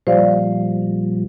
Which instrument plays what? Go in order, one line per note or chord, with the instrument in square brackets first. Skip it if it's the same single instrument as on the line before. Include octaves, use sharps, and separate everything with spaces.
[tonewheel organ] A#2 F3 G3 [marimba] C5 D5 F5